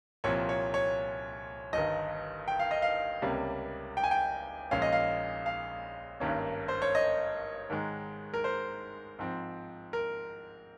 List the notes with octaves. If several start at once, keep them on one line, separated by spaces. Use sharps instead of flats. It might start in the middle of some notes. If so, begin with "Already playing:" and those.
C2 A#2 F3 C4 C#5
C#5
C#5
G1 G2 D#3 D#5
G5
F5
D#5
F5
C#2 C3 G3 A#3 C#4
G5
G#5
G5
A#1 A#2 G#3 C#4 F5
D#5
F5
F5
G#1 G2 D#3 A#3 C#4
C5
C#5
D#5
G#2 D#3 G#3
A#4
C5
G#2 F3 C4
A#4